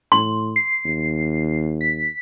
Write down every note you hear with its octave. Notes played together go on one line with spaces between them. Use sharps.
A2 C6
C7
D#2
B6